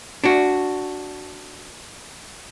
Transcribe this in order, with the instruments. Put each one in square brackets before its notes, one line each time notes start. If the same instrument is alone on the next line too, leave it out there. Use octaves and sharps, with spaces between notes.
[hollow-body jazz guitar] D4 F#4